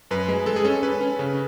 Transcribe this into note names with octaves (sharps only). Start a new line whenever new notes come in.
F#2 B4
G#3
G#3 A4
G#4
C#4 A4
C#4 B4
C#4
C#3